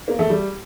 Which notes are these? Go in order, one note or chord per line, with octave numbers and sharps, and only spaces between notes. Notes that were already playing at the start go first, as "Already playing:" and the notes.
A#3
A3
G3